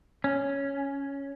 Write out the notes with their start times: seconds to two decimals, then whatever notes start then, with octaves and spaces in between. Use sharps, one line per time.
0.24 C#4